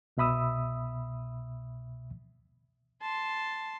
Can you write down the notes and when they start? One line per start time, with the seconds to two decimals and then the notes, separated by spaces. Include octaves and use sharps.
0.17 C2 B2 E5 B5 D#6 E6
3.02 A5 C6